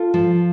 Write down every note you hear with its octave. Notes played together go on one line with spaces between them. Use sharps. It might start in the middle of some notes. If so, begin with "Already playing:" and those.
Already playing: F4 A4
F3